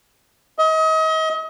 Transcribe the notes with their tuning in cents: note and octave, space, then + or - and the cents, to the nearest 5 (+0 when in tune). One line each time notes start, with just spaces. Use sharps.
D#5 +35